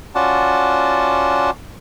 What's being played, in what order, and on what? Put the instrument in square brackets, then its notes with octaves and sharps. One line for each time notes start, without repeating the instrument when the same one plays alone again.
[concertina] C#4 F4 F#4 D5 F#5 A5